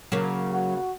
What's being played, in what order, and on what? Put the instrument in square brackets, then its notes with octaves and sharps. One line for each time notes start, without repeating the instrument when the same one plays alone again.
[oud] C#3 A#3 [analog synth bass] F#3
[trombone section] F#4